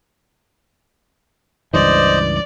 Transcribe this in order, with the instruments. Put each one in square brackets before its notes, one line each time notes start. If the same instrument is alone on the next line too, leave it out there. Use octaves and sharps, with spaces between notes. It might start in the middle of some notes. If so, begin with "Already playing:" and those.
[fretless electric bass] C#2 G2 E3 [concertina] C5 D#5 [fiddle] D5